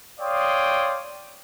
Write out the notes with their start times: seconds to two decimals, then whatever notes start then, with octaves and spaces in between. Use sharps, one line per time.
0.20 C#5 D5 F5 G5 C6 D#6